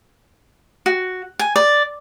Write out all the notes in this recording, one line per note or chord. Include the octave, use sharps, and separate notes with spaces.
F#4
G#5
D5